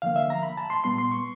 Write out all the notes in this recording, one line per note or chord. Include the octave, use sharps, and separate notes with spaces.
D3 F3 A#3 F5
E5
A#5
B5
A5
C6
A#2 G3 B3 C6
C6
C#6